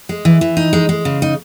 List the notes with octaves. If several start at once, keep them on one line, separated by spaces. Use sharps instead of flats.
G#3
E3
E3
D#4
G#3
G#3
C#3
D#4